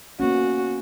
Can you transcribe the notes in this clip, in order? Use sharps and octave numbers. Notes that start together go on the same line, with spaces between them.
A#3 B3 C#4 F#4